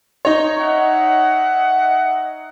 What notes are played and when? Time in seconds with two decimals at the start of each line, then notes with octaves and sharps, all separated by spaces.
0.25 D#4 C#5
0.59 D#5 E5 F#5